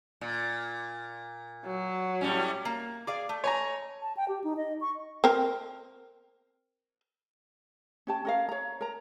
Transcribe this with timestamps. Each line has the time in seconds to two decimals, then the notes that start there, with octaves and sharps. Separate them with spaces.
0.21 A#2
1.66 F#3
2.21 A2 G3 C#4
2.65 A#3
3.07 G#4 D5 F5 D6
3.29 A3
3.44 C#5 G#5 A#5
4.02 A5
4.17 G5
4.28 G4
4.44 D#4
4.57 D#5
4.81 C#6
5.24 C4 A#4
8.07 C#4 G4 A5
8.25 C#4 A#4 F5
8.49 C#5 A#5
8.81 A#4 A#5